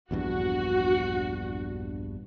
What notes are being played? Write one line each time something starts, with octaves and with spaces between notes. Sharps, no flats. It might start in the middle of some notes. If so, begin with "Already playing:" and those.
A#1 E2 G2 F#4